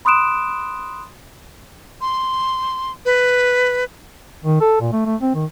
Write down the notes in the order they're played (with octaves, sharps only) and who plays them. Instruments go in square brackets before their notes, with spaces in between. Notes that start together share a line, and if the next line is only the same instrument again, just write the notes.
[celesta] B5 C6 D#6 F#6 D7 E7
[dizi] C6
B4
[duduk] D#3
A4
A#2
A3
A3
C4
D#3